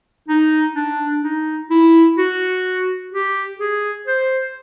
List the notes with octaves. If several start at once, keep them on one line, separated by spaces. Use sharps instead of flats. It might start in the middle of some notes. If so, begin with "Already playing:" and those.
D#4
D4
D#4
E4
F#4
G4
G#4
C5